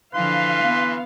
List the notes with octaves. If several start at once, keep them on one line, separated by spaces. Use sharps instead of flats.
D3 E3 F3 B4 F5 C6
B3